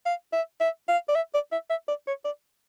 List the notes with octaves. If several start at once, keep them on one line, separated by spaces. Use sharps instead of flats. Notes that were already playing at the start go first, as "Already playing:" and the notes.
F5
E5
E5
F5
D5
E5
D5
E5
E5
D5
C#5
D5